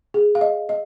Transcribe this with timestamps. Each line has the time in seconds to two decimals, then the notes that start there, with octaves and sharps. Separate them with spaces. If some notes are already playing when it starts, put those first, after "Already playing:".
0.14 G#4
0.35 F5
0.41 D#5
0.69 D#5